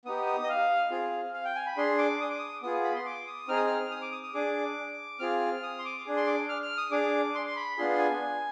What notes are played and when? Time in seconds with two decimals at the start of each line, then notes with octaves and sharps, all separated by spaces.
0.05 B3 D#4 G4 D#6
0.26 D#6
0.44 D#5
0.49 F5
0.91 C4 F4 G#4
1.33 F5
1.45 G5
1.55 G#5
1.66 B5
1.77 D4 G#4 C6
1.98 D6
2.20 D#6
2.29 D6
2.38 D#6
2.62 B3 F4 G#4 D#6
2.84 B5
2.95 C6
3.06 D6
3.27 D#6
3.48 C4 D#4 G#4 F6
3.57 D#6
3.67 F6
3.91 D#6
4.02 D6
4.12 D#6
4.23 D#6
4.34 D4 G#4 D6
5.19 C4 F4 G#4 F6
5.63 D#6
5.79 C6
5.85 D6
6.05 D4 G#4
6.17 C6
6.26 D6
6.49 F6
6.62 F6
6.77 D#6
6.91 D4 G#4 D6
7.35 C6
7.47 C6
7.56 B5
7.77 B3 D4 F4 G#4 C6
7.98 G#5